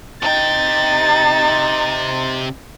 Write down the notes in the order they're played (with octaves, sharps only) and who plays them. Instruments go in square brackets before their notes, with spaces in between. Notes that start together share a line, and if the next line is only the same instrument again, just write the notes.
[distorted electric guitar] C3 G5 [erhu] D#4 [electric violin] A6